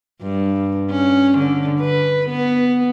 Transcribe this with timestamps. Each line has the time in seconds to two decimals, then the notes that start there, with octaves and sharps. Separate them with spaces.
0.22 G2
0.91 C#4
1.39 D3
1.80 B4
2.29 B3